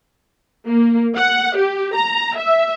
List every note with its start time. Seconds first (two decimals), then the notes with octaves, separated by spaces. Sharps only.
0.67 A#3
1.16 F#5
1.57 G4
1.95 A#5
2.37 E5